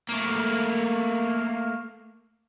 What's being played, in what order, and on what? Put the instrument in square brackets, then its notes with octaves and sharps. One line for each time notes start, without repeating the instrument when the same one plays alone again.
[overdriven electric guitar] A3 A#3